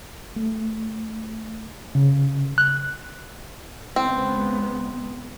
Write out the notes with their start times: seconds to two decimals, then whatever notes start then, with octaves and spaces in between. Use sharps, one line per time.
0.36 A3
1.95 C#3
2.58 F#6
3.96 C#2 B3 C4